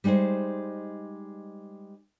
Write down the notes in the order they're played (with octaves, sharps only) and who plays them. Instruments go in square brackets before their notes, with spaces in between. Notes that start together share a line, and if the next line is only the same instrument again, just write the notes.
[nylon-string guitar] G3 G#3 D#4 G#4 C5